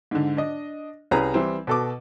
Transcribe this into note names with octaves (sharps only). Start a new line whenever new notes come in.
G#2 D3
D4 D#5
C2 C#4 G#4 B4 A#5
E3 G3 C4
B2 A4 D6